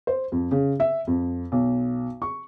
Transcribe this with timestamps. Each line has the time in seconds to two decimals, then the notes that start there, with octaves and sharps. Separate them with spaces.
0.07 C5
0.32 F2
0.51 C#3
0.80 E5
1.07 F2
1.52 B1
2.22 C#6